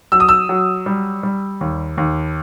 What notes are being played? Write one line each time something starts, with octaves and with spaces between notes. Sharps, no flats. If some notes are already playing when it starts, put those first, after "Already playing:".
F#3 E6
D#6
E6
F#3
G3
G3
D#2
D#2